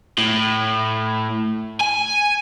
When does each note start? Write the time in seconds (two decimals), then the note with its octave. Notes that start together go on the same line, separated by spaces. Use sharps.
0.18 A2
1.81 G#5